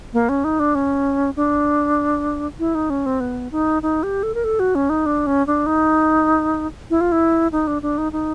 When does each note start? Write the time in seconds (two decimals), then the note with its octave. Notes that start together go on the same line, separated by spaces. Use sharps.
0.13 A#3
0.29 C#4
0.44 D#4
0.60 D4
0.75 C#4
1.36 D4
2.59 E4
2.75 D#4
2.90 C#4
3.06 C4
3.20 B3
3.52 D#4
3.82 D#4
4.03 G4
4.23 A4
4.35 A#4
4.44 A4
4.60 F#4
4.75 C#4
4.90 D#4
5.06 D4
5.27 C#4
5.47 D4
5.66 D#4
6.90 E4
7.01 F4
7.12 E4
7.52 D#4
7.67 D4
7.82 D4
7.98 D#4
8.12 D#4